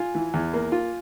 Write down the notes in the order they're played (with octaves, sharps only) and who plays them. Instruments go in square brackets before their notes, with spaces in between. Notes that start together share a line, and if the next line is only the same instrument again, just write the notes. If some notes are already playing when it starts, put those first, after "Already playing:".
Already playing: [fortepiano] F4 [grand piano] G#5
[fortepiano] E3
E2
A#3
F4